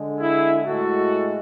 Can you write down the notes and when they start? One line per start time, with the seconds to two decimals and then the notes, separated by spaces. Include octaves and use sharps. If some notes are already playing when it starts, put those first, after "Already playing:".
Already playing: D3 G#3
0.21 E4 G#4
0.66 A2 G#3 F#4 A4